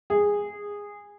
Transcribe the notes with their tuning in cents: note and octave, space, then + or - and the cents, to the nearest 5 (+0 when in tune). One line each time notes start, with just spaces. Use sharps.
G#4 -15